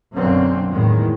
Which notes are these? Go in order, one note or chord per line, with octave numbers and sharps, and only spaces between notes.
B1 F#2 D3 A#3 C4 C#4
E2 A2 D#3 G#3